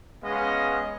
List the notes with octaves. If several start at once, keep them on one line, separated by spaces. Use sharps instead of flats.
G#3 B3 C#4 D#5 F5